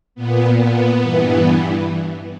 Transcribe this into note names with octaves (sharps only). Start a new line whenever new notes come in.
A#2 B3
B3
G2 E3